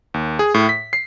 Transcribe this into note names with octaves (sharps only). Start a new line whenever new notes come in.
D#2
G#4
A2
B6
C7